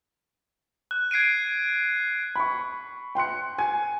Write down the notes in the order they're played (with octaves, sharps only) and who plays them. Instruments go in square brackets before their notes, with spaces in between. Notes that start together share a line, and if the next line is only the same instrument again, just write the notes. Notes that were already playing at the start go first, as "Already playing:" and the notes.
[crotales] F#6
G#6 C7 D7 D#7
[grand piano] B5 C#6
G5 C6 F#6 C#7
G#5 G#6